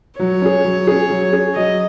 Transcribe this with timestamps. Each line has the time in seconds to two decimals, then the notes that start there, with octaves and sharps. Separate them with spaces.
0.19 F#3 C#5
0.42 C#4 G#4
0.65 F#3
0.87 C#4 G#4
1.10 F#3
1.33 C#4 G#4
1.55 F#3 D#5